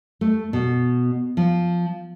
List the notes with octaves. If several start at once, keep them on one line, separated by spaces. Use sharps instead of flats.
A3
B2
F3